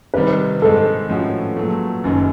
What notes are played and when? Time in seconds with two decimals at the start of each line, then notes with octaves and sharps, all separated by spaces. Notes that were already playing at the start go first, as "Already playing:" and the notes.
0.14 C3 D#3 G3 B4
0.61 G#2 D#3 G#3 C4 A4
1.09 A2 F3 G#3 C#4 F#4
1.57 A#2 F#3 A3
2.04 F#1 F#2 D#3